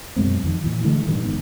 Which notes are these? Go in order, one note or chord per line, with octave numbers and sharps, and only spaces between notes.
F#2 B2 G#3 C4
F2 D#3
A#2 E3
D3 E3 G#3 A3
G2 A#2 D#3 E3
F#1 G#2 D#3 B3